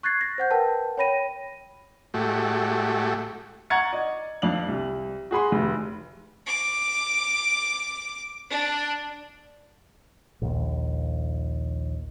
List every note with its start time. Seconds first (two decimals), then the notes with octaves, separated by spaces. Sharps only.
0.03 C#6 F#6 G#6 A6 C7
0.21 A#6
0.38 C5 F#5 G6
0.51 A#4 B4 F#5 G5 A5
0.98 C#5 G5 B5 A#6 D#7
2.14 A2 G#3 A3 F#4 G4
3.70 F#5 A#5 C#6 G#6 A6 C#7
3.93 D5 D#5
4.42 F2 D4 F5 F#7
4.68 C2
5.31 F#4 G#4 B5 C6
5.52 F1
6.47 D6
8.50 D4
10.42 A#1 D#2